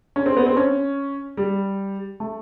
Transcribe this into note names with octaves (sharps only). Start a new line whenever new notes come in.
C#4
C4
B3
C4
C#4
G3
A3